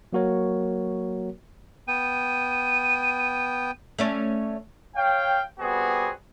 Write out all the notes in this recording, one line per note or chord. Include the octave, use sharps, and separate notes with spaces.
F#3 A#3 F#4 A#4 C#5
B3 G5 D#7
A3 C#4 D5
C#5 F5 G5
G3 B3 C4 F#4 G#4